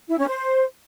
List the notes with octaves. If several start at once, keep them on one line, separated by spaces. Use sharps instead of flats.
E4
C#4
C5